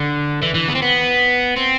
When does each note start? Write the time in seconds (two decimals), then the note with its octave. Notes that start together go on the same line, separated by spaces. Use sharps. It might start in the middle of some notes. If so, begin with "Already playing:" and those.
Already playing: D3
0.42 E3
0.55 E3
0.68 B3
0.75 C4
0.82 B3
1.57 C4